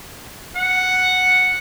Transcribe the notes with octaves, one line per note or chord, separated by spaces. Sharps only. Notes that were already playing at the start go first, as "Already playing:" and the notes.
F#5